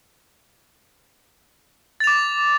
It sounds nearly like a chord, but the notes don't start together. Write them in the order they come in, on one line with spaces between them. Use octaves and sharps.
A6 F7 D6